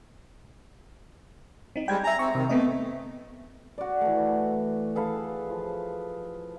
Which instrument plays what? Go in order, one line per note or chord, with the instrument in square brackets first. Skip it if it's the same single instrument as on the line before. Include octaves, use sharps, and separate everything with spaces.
[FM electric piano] C4 D#4
[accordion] G3 G#3 [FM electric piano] G5 G#6
[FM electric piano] E5 G#5 [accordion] A#5
[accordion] C4 [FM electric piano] C#6
[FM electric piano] C3 [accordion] D#3
[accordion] A3 [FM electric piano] B3 C4 D#5
[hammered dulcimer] F#4 D5
E3 A3
G#4 A4 B4 F5
F3